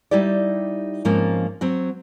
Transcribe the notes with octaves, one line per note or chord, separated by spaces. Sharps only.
G3 D#4 E4 G4 D5
G#2 F3 A#3 C4 C#4 F4
F#3 C4 F#4